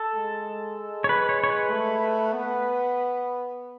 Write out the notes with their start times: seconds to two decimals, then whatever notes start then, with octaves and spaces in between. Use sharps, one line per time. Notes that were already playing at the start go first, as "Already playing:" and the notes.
Already playing: A4
0.16 G#3
1.04 C#5
1.09 B4
1.29 C#5
1.44 C#5
1.50 B4
1.71 A3
2.33 B3